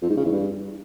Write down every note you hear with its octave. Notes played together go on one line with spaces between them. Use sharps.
F2
G#2
C#3
E2
G2